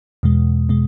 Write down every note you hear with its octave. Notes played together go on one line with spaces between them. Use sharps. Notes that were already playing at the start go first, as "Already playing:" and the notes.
E2 B2 G#3
B2 G#3